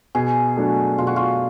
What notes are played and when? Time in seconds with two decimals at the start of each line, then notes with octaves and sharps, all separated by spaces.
0.15 B2 G#4
0.57 F#3 A3 D4 F#4
0.98 B2 F4
1.07 F#4
1.16 F4